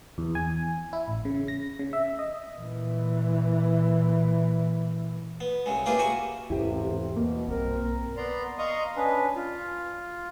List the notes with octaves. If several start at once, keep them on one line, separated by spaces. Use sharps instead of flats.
E2
G#5
E4
A1
C#3
A#6
C#3
E5
D#5
A#2 E3
B3
C2 C#3 G#3
A#3 E4 F4 G4 G#4 B4
F#4 E5 F#5 G#5
A1 E2 G#2 C3 E4 G4
B2 A#3
B1 G2 C4 A#4
B3 D5 A#5 C6
D#5 F5 A#5 C6 C#6 D#6
C#4 D4 B4
F4